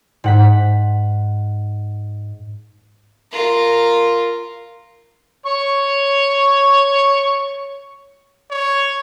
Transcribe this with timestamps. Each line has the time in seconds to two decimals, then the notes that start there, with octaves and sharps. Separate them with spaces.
0.24 G#2 F#5 B6
3.31 F4 A#4
5.46 C#5 C#6
8.51 C#5